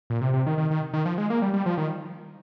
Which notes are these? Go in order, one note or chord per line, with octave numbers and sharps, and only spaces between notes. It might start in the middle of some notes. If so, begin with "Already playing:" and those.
A#2
C3
C3
D#3
D#3
D#3
D#3
F3
G#3
A#3
G3
G3
F3
D#3